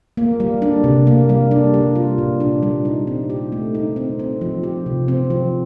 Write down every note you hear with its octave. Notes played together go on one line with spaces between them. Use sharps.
A#3
G3
D4
C3
A#3
G3
D4
G3
F4
A#2
D4
G3
D#4
C4
G4
A3
D#4
C4
C4
F3
G4
C3
C4
F3